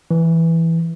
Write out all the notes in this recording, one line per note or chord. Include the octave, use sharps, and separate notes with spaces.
E3